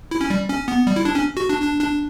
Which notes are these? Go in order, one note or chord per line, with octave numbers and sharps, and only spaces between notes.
E4
C#4
G3
C#4
B3
G3
E4
D4
C#4
F#4
D4
D4
D4